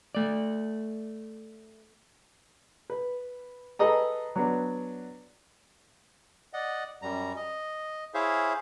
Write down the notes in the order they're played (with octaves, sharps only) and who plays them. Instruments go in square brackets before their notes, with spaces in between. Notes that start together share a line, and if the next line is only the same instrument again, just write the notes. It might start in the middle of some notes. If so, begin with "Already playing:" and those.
[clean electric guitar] A3 D5
[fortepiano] B4
G#4 A4 B4 D#5 A#5
F#3 B3 D4
[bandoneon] D5 D#5 F#5
F#2 G3 A#5
D#5
E4 G#4 C5 C#5 E5 F5